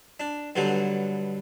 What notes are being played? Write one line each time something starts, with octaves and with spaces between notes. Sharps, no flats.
D4
G2 B2 D3 F#3